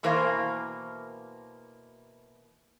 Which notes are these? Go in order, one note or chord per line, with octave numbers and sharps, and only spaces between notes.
B2 E3 A#3 A#4 C5 F5